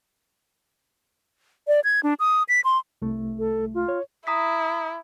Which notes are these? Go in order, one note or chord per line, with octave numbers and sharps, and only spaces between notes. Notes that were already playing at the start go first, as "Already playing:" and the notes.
D5
G#6
D4
D#6
B6
C6
C2 A3
A4
F4
C#5
E4 A#5 D#6 B6